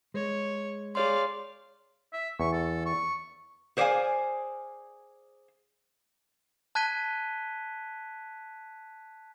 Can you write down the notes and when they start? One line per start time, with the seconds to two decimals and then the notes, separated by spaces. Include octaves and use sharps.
0.14 G#3 C#5
0.95 G#4 C#5 D5 F5 C6
2.13 E5
2.40 E2 C#6
2.53 A4
2.86 C#6
3.77 G#4 C5 D5 E5 F5 G#5
6.75 A5 F#6 G#6 B6 D#7 G7